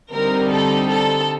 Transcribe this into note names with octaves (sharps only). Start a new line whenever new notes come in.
D3 G3 C4 D#4 A#4
A4
A4